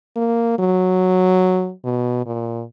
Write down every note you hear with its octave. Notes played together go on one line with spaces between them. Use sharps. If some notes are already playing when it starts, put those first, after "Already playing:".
A#3
F#3
B2
A#2